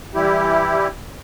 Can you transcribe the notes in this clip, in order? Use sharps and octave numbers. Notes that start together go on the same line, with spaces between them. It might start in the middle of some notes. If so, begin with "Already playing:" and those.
E3 G3 E4 G4